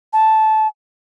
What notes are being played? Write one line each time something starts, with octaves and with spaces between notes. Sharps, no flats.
A5